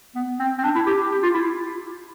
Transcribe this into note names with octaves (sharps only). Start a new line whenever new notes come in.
B3
C4
C4
D4
E4
G4
G4
F4
E4